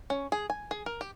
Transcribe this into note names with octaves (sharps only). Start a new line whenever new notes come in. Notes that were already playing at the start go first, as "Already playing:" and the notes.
C#4
G#4
G#5
G#4
A#4
G4